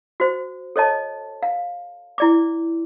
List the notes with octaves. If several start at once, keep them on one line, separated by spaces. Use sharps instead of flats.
F#4 C5
A4 C#5 D#5 A5
F5
E4 D5 D6